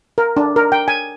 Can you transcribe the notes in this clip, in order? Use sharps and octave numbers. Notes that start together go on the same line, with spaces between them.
A#4
D4
A#4
G5
G#5